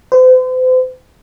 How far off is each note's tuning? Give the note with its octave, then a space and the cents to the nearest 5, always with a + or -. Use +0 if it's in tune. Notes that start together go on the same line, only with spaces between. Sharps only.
C5 -40